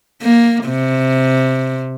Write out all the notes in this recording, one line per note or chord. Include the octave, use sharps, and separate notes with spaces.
A#3
C3